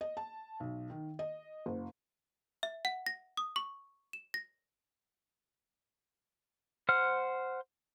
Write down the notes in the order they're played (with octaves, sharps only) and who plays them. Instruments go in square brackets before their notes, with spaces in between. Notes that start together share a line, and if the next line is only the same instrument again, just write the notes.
[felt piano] D#5
A5
B1
D#3
D#5
F#1
[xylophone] E5
F#5
A#6
D#6
C#6
E7
A#6
[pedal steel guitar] C5 F#5 F6